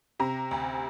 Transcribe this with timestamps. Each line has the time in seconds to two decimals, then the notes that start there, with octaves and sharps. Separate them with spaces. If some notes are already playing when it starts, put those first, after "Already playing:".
0.20 C3 A#5
0.51 D2